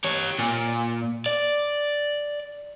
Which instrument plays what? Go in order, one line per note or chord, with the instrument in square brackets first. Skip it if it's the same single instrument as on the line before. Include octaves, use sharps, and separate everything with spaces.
[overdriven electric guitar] G4 C#5
A#2
D5